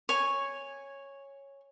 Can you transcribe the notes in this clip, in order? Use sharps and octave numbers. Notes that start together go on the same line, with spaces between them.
C#5 G#5